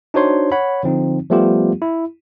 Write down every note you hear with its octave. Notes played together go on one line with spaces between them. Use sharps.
D4 D#4 F#4 C5 C#5 C6
C#5 F#5 B5
D3 F3 C4 D#4
F3 G3 A3 B3 F4 G4
E4